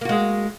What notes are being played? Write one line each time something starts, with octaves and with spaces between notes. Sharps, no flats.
G#3 A#3 F#4